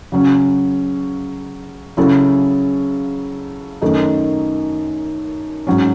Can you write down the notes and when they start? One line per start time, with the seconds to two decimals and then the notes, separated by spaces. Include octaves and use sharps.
0.12 C#3 F#3 C#4
1.97 C#3 F#3 C#4 E4 A4
3.82 F#2 D#3 A3 D#4 A4
5.67 G#2 F#3 C#4